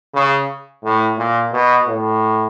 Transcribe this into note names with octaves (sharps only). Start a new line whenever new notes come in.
C#3
A2
A#2
B2
A2